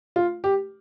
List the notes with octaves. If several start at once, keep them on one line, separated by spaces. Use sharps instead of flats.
F4
G4